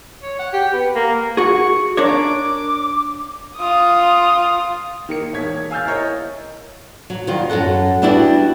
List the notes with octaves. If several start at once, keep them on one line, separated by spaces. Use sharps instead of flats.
C#5
F#5
G4
B3
A#3
F#4 G#4 C#6
D4 A#4 C#5 D6
F4 D#6
D#3 A#3 C#7
E1 C#5 G#6 B6
F5 G#5 E6 F6 G6 A6
E4 A#4 C#5 D#5
F#3
D#3 G3 F4
F#2 F#4 A4 F#5
G3 B3 D4 E4 F#4 G4